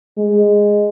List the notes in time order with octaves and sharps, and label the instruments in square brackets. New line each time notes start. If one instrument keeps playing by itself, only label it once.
[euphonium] G#3